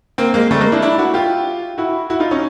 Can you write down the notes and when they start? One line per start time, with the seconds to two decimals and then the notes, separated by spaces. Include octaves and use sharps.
0.18 A#3 C4
0.34 G#3 A#3
0.51 G3 A3
0.61 G#3 A#3
0.72 D4 E4
0.82 D4 E4
0.98 E4 F#4
1.14 F4 G4
1.78 E4 F#4
2.10 E4 F#4
2.20 D#4 F4
2.31 C#4 D#4